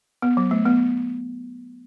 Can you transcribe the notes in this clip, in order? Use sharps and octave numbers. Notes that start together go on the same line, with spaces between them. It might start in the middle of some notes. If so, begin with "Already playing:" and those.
B3
F#3
A3
B3